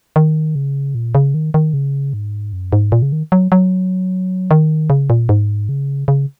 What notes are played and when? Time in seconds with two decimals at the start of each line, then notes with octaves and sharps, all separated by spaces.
0.16 D#3
0.55 C#3
0.95 A#2
1.15 C#3
1.34 D#3
1.54 D#3
1.74 C#3
2.13 G#2
2.53 F#2
2.73 G#2
2.92 A#2
3.02 C#3
3.12 D#3
3.32 F#3
3.52 F#3
4.51 D#3
4.90 C#3
5.10 A#2
5.29 G#2
5.69 C#3
6.08 C#3